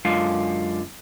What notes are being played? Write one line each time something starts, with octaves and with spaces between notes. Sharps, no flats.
F#2 D3 G#3 F4 F5